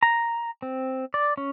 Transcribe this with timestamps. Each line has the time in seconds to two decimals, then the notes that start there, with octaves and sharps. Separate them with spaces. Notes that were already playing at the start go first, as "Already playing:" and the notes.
0.03 A#5
0.62 C4
1.14 D5
1.37 C#4